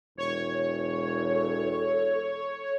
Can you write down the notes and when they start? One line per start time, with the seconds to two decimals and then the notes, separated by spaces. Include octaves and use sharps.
0.17 E1 C#5
1.30 A4